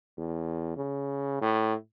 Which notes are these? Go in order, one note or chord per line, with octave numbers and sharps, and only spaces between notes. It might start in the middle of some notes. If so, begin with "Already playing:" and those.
E2
C#3
A2